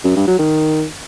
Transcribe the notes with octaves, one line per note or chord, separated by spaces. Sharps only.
F#2
G2
F#3
D#3